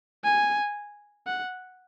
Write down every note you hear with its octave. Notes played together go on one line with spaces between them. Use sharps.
G#5
F#5